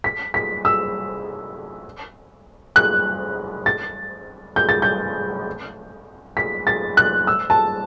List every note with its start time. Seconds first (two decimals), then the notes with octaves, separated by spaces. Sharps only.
0.04 B6
0.34 B6
0.65 E6
2.76 F#6
3.66 A6
4.56 G6
4.69 A6
4.82 G6
6.37 B6
6.67 A6
6.97 F#6
7.27 E6
7.50 A5